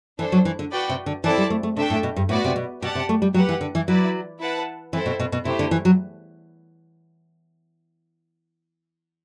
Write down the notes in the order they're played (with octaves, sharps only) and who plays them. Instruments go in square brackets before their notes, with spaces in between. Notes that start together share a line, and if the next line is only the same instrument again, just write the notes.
[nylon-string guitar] E3 [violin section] D4 A4 C5
[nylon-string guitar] F#3
E3
D3
[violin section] F#4 B4 D5 G5
[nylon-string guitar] C3
D3
[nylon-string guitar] E3 [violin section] C4 E4 A4 D5 A5
[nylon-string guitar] G3
A3
A3
[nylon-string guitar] C3 [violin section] A3 D4 A4 E5 G5
[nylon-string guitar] A2
B2
G2
[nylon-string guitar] A2 [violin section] B3 F#4 B4 D5
[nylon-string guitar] C3
B2
[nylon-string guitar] B2 [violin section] G4 D5 F#5 A5
[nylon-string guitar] C3
A3
G3
[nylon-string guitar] F#3 [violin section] G4 B4 F#5
[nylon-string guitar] E3
D3
E3
[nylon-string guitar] F#3 [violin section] E4 B4 D5
[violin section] E4 B4 F#5 A5
[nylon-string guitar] E3 [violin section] C4 E4 A4 C5
[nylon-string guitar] B2
B2
B2
[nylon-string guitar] C3 [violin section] A3 E4 G4 C5
[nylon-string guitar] D3
E3
F#3